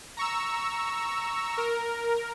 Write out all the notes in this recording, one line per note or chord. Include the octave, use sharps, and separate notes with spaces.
A#5 C#6 E6
A#4